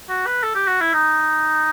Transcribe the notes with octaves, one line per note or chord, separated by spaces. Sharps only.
F#4
B4
A4
G4
F#4
E4
D#4